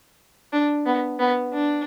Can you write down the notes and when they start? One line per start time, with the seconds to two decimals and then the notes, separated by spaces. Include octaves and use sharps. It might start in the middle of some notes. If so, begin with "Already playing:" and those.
0.53 D4
0.86 B3
1.19 B3
1.53 D4